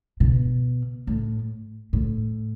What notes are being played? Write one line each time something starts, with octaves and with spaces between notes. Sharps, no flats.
B2
A2
A2